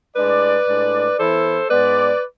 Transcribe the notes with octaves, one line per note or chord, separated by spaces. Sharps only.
A2 G#3 D4 B4 D5
A2 G#3 D4
E3 B3 E4 A4 C5
G#2 G#3 B3 B4 D5